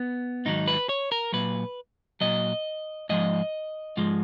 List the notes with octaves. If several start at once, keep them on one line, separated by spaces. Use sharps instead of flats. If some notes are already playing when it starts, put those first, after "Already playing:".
Already playing: B3
G#2 D#3 F#3 D#4
B4
C#5
A#4
A#2 F#3 B4
A#2 F#3 D#5
G#2 F3 G#3 D#5
G#2 F3 G#3